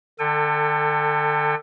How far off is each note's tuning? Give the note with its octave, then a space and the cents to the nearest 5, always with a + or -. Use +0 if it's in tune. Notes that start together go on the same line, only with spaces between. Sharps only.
D3 +35 A4 +20 G5 +40